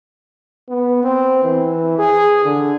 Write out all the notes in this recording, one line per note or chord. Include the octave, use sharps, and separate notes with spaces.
B3
C4
E3
G#4
D3